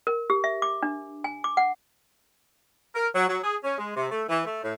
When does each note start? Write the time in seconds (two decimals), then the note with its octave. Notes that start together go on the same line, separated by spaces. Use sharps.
0.07 A#4
0.30 G4
0.44 E5
0.62 D6
0.83 D4
1.24 G#5
1.44 D6
1.57 F#5
2.95 A#4
3.14 F#3
3.28 F#3
3.42 G#4
3.63 C#4
3.77 G#3
3.96 C3
4.10 A3
4.29 E3
4.46 A3
4.62 A2